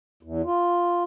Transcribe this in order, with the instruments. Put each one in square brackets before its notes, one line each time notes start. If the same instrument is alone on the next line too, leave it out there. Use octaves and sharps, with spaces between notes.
[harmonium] E2
F4